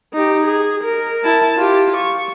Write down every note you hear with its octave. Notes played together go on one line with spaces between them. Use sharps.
D#4 G4
G#4
A#4
E4 A5
F4 G4
C#6